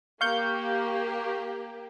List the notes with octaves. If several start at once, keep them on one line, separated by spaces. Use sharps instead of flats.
A#3 G4 F5 C#6 G6